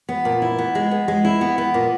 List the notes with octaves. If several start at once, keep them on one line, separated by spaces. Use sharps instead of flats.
B3
A#2
E4
B3
G#3
B3
G#3
E4
B3
B3
A#2